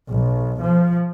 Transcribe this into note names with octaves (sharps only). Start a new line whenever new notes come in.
B1
F3